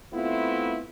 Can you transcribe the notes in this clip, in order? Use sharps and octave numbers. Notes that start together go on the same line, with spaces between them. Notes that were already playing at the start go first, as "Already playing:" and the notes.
A3 B3 C4 E4 F4